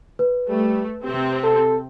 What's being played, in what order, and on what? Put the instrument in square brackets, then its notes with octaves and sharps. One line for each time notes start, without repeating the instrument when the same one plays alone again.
[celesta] B4
[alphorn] G3 [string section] A3
[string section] C3 C4 [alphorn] G4
[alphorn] A4